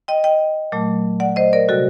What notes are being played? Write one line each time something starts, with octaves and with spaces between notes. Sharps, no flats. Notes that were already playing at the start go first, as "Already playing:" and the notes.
D#5 G5
D#5 G5
A#2 F#3 A3
D5 F#5
C5 D#5
A#4 D5
C3 G3 F#4 A4